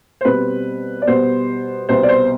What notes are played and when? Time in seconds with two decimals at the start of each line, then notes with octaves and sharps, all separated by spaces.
0.21 C5
0.25 B2 G3 C4 B4
1.02 D5
1.07 B2 G3 B3 C5
1.89 C2 B2 B3 C5
2.03 D5
2.09 C5